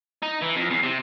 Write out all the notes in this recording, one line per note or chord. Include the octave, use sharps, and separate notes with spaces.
D#4
E3
F2
E2
C3